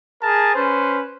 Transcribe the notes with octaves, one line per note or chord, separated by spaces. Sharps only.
G#4 A#4 A5
C#4 B4 C5